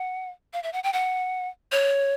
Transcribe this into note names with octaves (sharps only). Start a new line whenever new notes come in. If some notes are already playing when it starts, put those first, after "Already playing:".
Already playing: F#5
F5
E5
F#5
G5
F#5
C#5